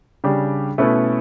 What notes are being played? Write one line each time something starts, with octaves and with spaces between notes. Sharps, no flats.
C#3 G3 D4 G4
B2 A3 C#4 E4 B4